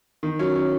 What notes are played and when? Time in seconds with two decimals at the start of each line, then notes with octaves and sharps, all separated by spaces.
0.23 D#3
0.39 F#3 C#4
0.56 C#4